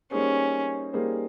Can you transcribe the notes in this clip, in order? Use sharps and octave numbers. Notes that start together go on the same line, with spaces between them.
G3 A#3 C#4 D#4 G#4 C5
G3 A#3 D#4 G#4 C5